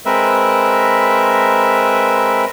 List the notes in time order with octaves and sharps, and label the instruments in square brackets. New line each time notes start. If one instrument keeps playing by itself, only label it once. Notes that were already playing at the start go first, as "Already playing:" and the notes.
[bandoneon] G#3 C4 A#4 B4 E5